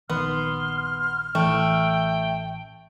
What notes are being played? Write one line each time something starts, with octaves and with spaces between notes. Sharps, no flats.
A#1 D#3 B3 C6 F6
A1 E3 A3 G5